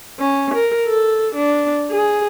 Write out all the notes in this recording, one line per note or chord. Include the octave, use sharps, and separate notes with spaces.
C#4
A#4
A4
D4
G#4